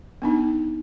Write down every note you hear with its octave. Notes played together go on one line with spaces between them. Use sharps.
B3 D4 D#4